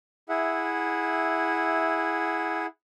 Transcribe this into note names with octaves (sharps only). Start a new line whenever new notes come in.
E4 G#4 E5 F#5